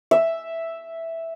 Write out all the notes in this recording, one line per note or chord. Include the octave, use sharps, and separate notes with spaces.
E5